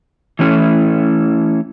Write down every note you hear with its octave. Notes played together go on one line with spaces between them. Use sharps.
E3 A3 C#4 E4